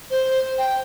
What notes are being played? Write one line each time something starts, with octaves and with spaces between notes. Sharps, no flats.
C5
G5